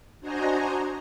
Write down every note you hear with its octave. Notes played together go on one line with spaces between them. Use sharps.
D4 F#4 C5 D#5 G#5 A#5